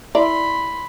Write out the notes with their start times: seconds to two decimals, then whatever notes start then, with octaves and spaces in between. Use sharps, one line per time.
0.15 E4 A#4 D5 B5 C6